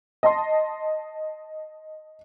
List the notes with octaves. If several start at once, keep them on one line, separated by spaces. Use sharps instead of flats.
D#5 A5 C6